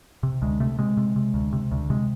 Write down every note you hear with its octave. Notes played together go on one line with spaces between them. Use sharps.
C3
D2 G#3
C3 A3
C3 G#3
C3
C3
D2
C3
D2
C3 G#3